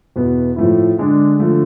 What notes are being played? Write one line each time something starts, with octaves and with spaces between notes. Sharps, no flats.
E2 B2 B3 E4
A2 F3 A3 E4
D3 G#3 D4
D3 F3 A3